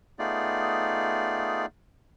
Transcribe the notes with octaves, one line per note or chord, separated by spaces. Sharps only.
A3 B3 D#4 F4 G#4 D5